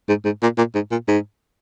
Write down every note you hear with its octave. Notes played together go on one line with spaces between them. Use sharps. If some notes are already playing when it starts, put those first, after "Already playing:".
G#2
G#2
A#2
A#2
G#2
A#2
G#2